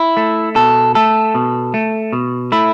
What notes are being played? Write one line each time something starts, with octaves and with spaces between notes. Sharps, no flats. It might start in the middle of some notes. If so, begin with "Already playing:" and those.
Already playing: E4
A3
B2 A4
A3 A4
B2
A3
B2
A3 E4